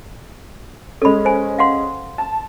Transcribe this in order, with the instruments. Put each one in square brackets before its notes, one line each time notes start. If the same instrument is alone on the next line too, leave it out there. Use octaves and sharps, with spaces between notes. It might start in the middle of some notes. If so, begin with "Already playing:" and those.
[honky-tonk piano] G#3 C#4 [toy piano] A4 B5
[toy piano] C5 G#5
F5 F#5 C6
[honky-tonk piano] A5